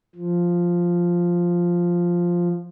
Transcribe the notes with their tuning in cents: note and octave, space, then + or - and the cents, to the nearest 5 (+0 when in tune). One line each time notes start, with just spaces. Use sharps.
F3 +0